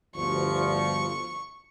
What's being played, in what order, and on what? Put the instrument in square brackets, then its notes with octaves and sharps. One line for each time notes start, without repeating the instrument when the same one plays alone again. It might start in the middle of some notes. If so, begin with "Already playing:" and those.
[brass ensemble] G1 D2 F3 [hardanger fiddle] C#6